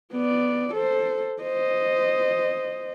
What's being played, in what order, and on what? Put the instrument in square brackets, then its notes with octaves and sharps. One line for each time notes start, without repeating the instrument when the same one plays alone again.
[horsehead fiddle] B3 D5
A4 C5
C5 D#5